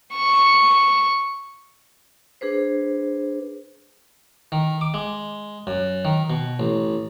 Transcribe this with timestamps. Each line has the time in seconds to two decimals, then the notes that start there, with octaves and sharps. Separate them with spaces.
0.15 C#6
2.41 D4 G#4 B4 C5
4.52 D#3
4.81 D6
4.94 G#3
5.67 F#2
6.05 D#3
6.30 B2
6.60 A1